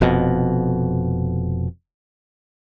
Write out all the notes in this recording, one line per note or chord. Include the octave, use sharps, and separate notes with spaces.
F1 F2 B2